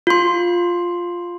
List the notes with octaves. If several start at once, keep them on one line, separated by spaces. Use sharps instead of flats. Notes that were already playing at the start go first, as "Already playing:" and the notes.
F4 C6